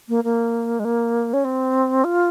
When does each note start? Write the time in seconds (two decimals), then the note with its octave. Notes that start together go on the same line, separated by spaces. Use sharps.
0.09 A#3
0.24 A#3
0.79 G#3
0.85 A#3
1.33 C#4
1.44 C4
2.04 F4